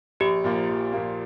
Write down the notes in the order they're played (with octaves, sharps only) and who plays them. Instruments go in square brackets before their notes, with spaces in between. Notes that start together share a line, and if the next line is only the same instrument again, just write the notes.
[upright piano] A#1 [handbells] G4
[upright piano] A#2 F3 A#3
A#1
A#2 F3 A#3